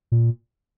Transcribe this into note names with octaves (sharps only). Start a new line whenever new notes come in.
A#2